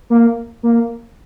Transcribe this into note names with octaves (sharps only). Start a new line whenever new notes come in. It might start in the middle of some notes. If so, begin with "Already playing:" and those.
A#3
A#3